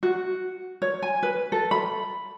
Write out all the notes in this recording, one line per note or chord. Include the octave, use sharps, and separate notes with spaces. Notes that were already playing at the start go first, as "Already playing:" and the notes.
F#4
C#5
G#5
B4
A4
B5